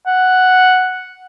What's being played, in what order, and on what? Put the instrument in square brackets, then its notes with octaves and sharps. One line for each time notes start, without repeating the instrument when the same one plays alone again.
[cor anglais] F#5